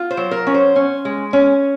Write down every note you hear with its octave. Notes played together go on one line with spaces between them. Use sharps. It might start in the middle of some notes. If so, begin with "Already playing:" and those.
Already playing: F4
C5
F#3
A#4
C#4
C5
C#4
G#3
C#4